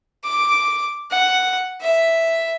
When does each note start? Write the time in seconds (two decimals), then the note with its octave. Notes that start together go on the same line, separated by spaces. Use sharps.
0.24 D6
1.11 F#5
1.82 E5